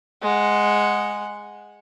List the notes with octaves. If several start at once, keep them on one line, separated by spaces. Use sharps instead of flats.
G#3 F#5